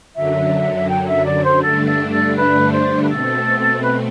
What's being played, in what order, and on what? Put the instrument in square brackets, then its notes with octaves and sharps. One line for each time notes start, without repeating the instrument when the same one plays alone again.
[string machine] F#2 D3 F#3 [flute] E5
[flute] G5
E5
D5
C5
[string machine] G2 D3 A3 D4 [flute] A4
[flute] A4
A4
B4
C5
B4
[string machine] B2 A3 C4 [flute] A4
[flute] B4